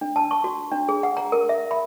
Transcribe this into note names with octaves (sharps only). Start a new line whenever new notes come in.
D4
A5
C#6
F#4
D4
G#4
F#5
A#5
A#4
E5
B5